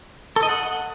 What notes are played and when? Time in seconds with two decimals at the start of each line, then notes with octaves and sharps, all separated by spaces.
0.36 A4
0.43 D#5
0.49 F#5